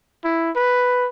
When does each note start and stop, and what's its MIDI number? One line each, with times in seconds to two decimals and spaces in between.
0.24 0.51 64
0.56 1.09 71